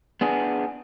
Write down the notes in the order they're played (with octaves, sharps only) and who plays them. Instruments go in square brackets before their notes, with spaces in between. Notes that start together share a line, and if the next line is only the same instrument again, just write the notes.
[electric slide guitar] B3 D4 G#4